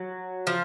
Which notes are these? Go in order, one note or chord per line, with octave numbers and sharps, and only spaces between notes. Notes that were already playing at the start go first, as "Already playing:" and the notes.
Already playing: F#3
F3